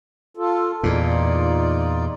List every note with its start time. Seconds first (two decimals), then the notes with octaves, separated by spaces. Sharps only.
0.37 F4 A4
0.83 E2 A#2 D#4 F4 D5